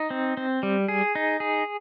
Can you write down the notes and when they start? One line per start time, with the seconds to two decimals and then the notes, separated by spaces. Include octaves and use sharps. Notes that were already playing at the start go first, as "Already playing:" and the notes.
Already playing: D#4
0.10 C4
0.37 C4
0.63 G3
0.88 G#4
1.15 D#4
1.40 G#4